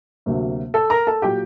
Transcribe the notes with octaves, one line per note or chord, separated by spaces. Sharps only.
D2 C3 F#3 A#3
A4 A5
A#4 A#5
A4 A5
A#2 F#3 G4 G5